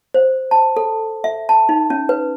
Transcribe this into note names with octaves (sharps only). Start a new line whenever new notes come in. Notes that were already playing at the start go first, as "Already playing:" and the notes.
C5
A5
A4
E5
A5
D#4
C#4
B4